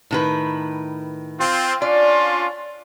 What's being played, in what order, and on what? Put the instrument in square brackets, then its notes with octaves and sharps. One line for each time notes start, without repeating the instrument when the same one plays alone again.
[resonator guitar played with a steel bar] A2 D#3 B4
[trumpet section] C4 F4
[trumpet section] C#4 D4 F4 [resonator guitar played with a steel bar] D5